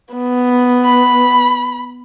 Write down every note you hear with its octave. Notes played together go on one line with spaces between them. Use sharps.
B3
B5